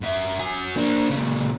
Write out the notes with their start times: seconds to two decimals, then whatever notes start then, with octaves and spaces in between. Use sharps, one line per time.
0.02 F#2 E5
0.40 F#4 G#5
0.76 A#3 D4
1.10 A#2 C#3